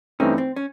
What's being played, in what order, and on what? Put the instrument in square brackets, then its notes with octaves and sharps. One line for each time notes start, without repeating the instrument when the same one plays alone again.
[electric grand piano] G2 E3 A3 C4 D#4 [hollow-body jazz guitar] C#4
[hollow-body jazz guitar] C4
C#4